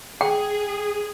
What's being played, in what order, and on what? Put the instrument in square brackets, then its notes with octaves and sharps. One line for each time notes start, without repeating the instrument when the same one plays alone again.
[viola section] G#4 [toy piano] G5